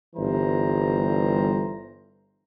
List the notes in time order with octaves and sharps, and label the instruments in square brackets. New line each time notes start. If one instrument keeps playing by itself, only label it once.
[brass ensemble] G1 E3 G3 C5 A#5